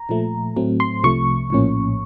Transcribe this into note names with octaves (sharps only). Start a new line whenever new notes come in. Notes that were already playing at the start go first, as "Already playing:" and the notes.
Already playing: A#5
A#2 F3 A3
A2 F#3 A3 C4
C6
C2 C3 F3 A3 C#6
A#1 A2 F3 A#3 C#4